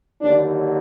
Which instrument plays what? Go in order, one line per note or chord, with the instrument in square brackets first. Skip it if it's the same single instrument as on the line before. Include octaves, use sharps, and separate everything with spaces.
[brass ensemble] D#2 D3 F#3 D4